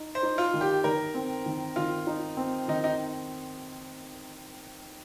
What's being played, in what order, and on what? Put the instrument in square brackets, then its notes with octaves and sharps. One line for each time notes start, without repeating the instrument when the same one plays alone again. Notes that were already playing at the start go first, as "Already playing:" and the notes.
Already playing: [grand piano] D#4
[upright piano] C5
[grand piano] D#4
[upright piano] F4
[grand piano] D#3
[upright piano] G4
[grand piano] D#3 [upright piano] A#4
[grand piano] C4
D#3
[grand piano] D#3 [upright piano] F4
[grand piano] D#4
C4
[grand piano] D#3 [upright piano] D#4
[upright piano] D#4